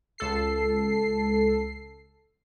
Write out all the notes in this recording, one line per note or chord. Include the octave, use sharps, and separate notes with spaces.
C#2 A4 C7